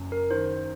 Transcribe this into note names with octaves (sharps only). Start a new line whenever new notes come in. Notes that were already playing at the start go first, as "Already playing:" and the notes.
Already playing: F#1 F#2
A#4
D#3 C5